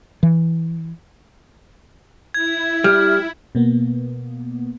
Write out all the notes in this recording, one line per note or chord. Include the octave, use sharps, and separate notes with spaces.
E3
E4 G#6
G3 F6
B2 A#3 B3